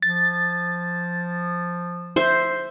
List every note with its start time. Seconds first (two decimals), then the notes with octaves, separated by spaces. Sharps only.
0.02 F3 A6
2.16 C5 E5